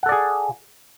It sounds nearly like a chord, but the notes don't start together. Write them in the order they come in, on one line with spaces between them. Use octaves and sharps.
F#5 A4 D5 G#4